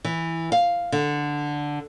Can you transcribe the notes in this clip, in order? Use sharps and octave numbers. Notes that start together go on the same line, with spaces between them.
E3
F5
D3